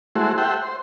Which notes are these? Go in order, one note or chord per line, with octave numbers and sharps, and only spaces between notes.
G#3 A3 E4 F#4 C5
G4 A4 C5 E5 F#5 G5
C5